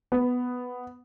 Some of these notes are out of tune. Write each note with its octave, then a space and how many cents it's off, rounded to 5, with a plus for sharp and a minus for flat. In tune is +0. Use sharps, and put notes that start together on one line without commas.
B3 +5